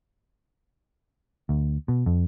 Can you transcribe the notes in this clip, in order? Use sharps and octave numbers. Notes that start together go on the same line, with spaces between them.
D2
B2
F2